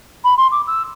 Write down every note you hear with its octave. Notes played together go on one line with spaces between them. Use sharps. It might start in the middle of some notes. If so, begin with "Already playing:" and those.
B5
C6
D6
E6